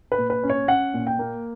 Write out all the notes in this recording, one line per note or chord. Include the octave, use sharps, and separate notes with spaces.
B4
A#2
B4
C#4
C#5
C#4 F#5
A#2
G5
A#3